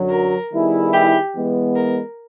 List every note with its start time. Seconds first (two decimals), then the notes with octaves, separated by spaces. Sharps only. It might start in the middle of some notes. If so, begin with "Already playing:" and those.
Already playing: F#2 D3 F#3
0.11 A#4
0.52 D#3 G3 B3 E4 G#4
0.93 G4
1.34 E3 G#3 B3
1.76 A#4